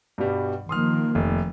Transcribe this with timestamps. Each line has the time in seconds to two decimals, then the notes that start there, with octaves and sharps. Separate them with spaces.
0.18 G2 B2 G3
0.69 D#3 F3 A#3 C6 D#6 F6
1.15 F1